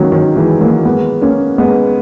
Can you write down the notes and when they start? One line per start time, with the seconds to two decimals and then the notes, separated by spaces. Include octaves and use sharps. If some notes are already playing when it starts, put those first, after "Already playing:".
Already playing: D#3 F#3 G#3 A#3 B3 C#4
0.12 D#3 F#3
0.36 E3 G#3
0.61 F#3 A#3
0.85 G#3 B3
1.21 A#3 C#4
1.58 G#3 B3